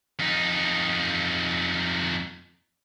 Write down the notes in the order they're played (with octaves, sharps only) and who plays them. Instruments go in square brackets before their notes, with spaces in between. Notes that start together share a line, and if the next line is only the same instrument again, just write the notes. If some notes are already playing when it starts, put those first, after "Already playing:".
[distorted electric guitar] F2 D#4